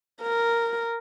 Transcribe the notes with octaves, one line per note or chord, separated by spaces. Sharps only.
A#4